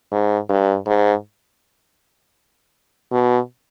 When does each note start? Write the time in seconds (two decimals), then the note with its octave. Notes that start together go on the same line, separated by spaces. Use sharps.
0.12 G#2
0.49 G2
0.86 G#2
3.12 B2